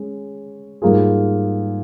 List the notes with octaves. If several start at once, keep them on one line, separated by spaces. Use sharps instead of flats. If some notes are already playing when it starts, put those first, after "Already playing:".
Already playing: G#3 C#4
G#2 G3 A#3 F4 G#4